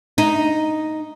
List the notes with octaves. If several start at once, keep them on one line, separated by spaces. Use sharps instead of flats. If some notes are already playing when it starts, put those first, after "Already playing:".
D#4